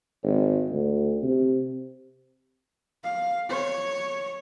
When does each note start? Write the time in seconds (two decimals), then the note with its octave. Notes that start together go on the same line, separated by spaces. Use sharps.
0.23 G#1
0.70 D2
1.23 C3
3.04 F5
3.49 C#5